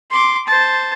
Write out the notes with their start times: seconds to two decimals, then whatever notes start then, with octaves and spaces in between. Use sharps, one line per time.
0.11 C6 D6
0.47 C5 A5